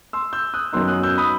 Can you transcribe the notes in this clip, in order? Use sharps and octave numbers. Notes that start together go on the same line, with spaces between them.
C6 E6
E6 G6
D#6 F#6
F#2 D#3 F#3 B3 D#4 C6 E6
D#6 F#6
E6 G6
B5 D#6